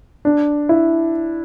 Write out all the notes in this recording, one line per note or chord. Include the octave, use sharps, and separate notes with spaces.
D4
E4